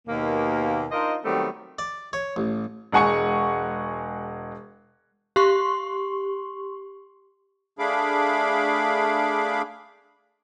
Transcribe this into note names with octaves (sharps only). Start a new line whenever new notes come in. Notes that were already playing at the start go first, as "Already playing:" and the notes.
D#2 B2 A#3
D4 D#4 F4 A#4 C5 D#5
D#3 F#3 G3 A3 B3 C4
D5
C#5
A1
E1 G#3 F#5 G#5 C#6 C#7
G4 C6 C#6
A3 D4 G#4 F5 B5 D6